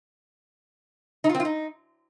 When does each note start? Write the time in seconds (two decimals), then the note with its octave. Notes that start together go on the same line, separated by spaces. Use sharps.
1.24 D#4
1.29 F4
1.34 C4
1.40 F4
1.45 D#4